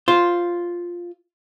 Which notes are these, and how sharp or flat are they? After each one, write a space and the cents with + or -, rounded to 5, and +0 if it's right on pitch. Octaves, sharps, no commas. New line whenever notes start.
F4 +0 C5 +0